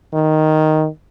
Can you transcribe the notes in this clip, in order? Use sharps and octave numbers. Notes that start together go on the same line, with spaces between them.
D#3